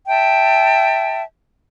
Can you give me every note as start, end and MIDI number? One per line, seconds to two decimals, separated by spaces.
0.07 1.22 76
0.07 1.22 79
0.07 1.22 81